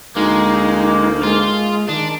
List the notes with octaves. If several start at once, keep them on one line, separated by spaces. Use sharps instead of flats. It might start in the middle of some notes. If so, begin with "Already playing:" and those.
D2 G#3 A#3 D#4
G#3 F4
D#3 D4